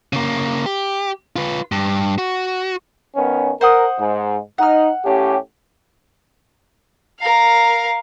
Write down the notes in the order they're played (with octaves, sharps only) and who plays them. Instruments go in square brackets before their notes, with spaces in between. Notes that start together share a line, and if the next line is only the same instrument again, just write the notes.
[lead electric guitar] C#3 A#3
G4
F4 B4
G2
F#4
[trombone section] D#3 B3 C#4
[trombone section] A#4 [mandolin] C5 F#5 D#6
[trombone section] G#2
[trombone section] D#4 [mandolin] F#5 F6
[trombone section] A2 C#4 G4
[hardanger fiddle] A#4 F5